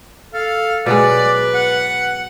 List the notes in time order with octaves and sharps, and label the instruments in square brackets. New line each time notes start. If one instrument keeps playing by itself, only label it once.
[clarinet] A4 [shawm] F5
[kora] B2 F#3 G#3 [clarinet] B4 [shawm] D5
[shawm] F#5